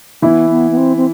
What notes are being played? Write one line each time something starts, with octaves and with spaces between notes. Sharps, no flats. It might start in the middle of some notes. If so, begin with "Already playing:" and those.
E3 B3 E4
B3
B3
C4
C4